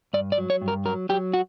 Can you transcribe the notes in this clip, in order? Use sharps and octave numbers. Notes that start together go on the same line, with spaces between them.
G2 D5
D5
F#3
C#5
G2
A#4
F#3 A#4
F#3 G4
F#4